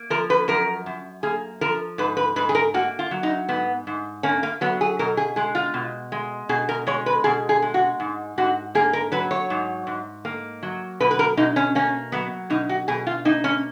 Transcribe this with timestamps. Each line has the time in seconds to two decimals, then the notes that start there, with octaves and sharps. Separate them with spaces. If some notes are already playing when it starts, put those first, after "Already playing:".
Already playing: A#3
0.10 F3 A#4
0.30 B4
0.48 F#2 A#4
0.86 F#2
1.23 A#3 G#4
1.61 F3 A#4
1.98 G#2 B4
2.17 B4
2.36 G#2 B4
2.49 G#4
2.55 A#4
2.74 A#3 F#4
2.99 F4
3.11 F#3
3.23 D#4
3.49 G#2 B3
3.87 G#2
4.23 A#3 C#4
4.43 A#3
4.61 F#3 B3
4.81 G#4
4.99 B2 A#4
5.17 G#4
5.36 G#3 G#4
5.55 F4
5.74 B2
6.12 G#3
6.49 B2 G#4
6.69 A#4
6.87 G#3 C#5
7.06 B4
7.24 B2 G#4
7.49 G#4
7.62 G#3
7.74 F#4
8.00 G#2
8.38 G#2 F#4
8.75 A#3 G#4
8.93 A#4
9.12 F#3 B4
9.31 C#5
9.50 G#2
9.87 G#2
10.25 A#3
10.63 F#3
11.00 B2 B4
11.11 B4
11.19 A#4
11.37 B2 D#4
11.56 C#4
11.75 A#3 C#4
12.12 F#3 B3
12.50 B2 D#4
12.69 F#4
12.88 B2 G#4
13.07 F4
13.25 A#3 D#4
13.44 C#4